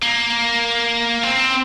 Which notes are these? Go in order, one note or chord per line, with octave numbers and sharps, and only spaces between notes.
A#3
C4